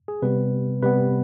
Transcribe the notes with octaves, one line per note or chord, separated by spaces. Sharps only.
G#4
C3 G3 B3 B4
C3 G3 B3 B4